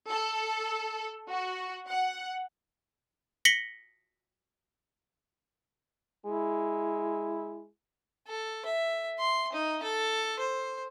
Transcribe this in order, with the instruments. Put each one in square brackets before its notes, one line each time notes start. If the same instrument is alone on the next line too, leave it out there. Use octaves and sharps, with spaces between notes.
[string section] A4
F#4
F#5
[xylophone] A#6 B6 C#7 F#7 G7
[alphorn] G#3 [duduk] E4
[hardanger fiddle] A4
E5
C6
D#4
A4
C5